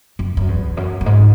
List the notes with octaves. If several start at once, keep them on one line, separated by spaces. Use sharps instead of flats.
F#2
F#2
E2
F#2
F#2
G#2